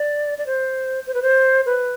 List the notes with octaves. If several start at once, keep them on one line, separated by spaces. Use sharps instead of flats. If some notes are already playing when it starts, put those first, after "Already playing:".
Already playing: D5
D5
C5
C5
B4
C5
B4